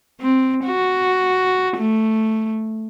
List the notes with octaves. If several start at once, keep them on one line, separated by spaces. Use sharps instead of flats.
C4
F#4
A3